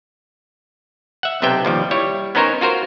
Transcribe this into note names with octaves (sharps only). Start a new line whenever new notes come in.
E5 F#5
B1 C3 B3 E5 G5
D#2 F3 G3
G3 E4 C#5
B3 C#4 D#4 A#4 C5 C#5
F4 F#4 A#4 C5